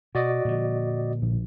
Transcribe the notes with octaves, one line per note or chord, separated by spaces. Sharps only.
B2 F#4 D5 D#5
A#2 D3 F3
A#1